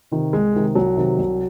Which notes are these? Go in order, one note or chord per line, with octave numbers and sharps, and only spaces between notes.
C3 D#3
C2 G#3
C3 D#3
C2 F#3
C3 D#3
C2